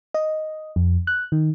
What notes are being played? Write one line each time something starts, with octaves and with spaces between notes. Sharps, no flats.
D#5
F2
F#6
D#3